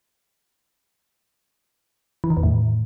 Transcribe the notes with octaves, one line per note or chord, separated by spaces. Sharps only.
E3
D#3
E2
A2